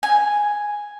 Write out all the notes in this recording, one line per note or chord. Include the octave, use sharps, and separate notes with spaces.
G#5